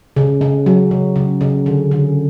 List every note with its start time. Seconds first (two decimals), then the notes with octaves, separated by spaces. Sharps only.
0.16 C#3
0.41 C#3
0.66 F#3
0.91 C#3
1.16 C#3
1.41 C#3
1.66 D3
1.91 D3